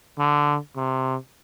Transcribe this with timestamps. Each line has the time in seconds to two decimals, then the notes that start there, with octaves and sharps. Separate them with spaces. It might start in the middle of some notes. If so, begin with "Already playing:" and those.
0.18 D3
0.76 C3